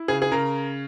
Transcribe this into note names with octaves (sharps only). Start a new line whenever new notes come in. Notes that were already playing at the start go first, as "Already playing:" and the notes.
Already playing: E4
C#3 G#4
G#4
C#3 A#4